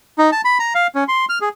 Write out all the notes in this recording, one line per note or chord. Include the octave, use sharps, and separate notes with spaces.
D#4
A5
B5
A#5
F5
C#4
C6
F6
G#4